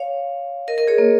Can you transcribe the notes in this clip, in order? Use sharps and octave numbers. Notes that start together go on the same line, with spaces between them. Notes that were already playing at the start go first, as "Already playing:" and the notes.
Already playing: C#5 F5
A#4 D#5
A#4 D#5
G#4 C#5
A#3